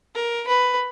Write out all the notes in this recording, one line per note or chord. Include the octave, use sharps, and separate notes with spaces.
A#4
B4